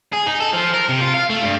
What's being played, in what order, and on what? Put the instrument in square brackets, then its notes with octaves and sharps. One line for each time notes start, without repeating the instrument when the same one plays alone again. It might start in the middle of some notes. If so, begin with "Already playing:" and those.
[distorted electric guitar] G#4
D#4
A4
F3
A#4
C3
F4
F5
A3
G2